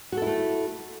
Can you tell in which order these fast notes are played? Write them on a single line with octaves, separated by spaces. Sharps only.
F#4 A4 E4 A3